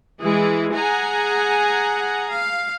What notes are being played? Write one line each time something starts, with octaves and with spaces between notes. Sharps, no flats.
E3 G#3 E4 G#4
G#4 F#5 G#5 A#5
F5